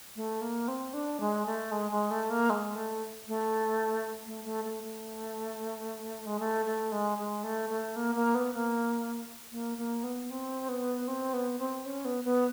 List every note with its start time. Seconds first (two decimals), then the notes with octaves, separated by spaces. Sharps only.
0.16 A3
0.41 A#3
0.68 C4
0.94 D4
1.20 G#3
1.46 A3
1.72 G#3
1.92 G#3
2.11 A3
2.30 A#3
2.50 G#3
2.76 A3
3.28 A3
4.26 A3
4.45 A3
4.64 A3
4.83 A3
6.26 G#3
6.40 A3
6.66 A3
6.92 G#3
7.18 G#3
7.44 A3
7.70 A3
7.96 A#3
8.15 A#3
8.35 B3
8.54 A#3
9.52 A#3
9.78 A#3
10.03 B3
10.30 C4
10.69 B3
11.08 C4
11.34 B3
11.59 C4
11.85 C#4
12.05 B3
12.24 B3